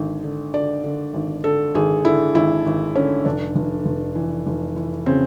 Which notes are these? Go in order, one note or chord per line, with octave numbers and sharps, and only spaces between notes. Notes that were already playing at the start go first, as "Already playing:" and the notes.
Already playing: G#1 D3
D3
D3 D5
D3
G#1
D3 A4
G#1 G#4
D3 E4
G#1 E4
G#1
D3 C#4
F1 D4
F1
F1
E3
F1
E3
C#3 C4